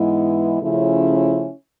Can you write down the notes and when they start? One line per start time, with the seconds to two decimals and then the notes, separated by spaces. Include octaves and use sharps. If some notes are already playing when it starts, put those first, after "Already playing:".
Already playing: G#2 E3 G#3 B3 E4
0.61 C#3 F3 A3 C#4 E4